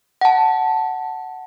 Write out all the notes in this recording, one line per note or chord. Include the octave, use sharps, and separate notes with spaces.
F#5 A5